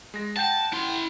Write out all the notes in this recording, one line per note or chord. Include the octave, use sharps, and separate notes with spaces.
G#3 A#6
F#5 G5 A5 G6
E4 C6